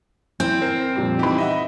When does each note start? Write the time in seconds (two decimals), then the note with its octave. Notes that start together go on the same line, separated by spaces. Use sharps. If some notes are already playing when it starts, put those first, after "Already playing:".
0.40 E3 C4 G6
0.62 A#4 C5
0.96 F2 A#2 G3
1.19 E3 D#4 G4 B5
1.38 D#5 E5 F#5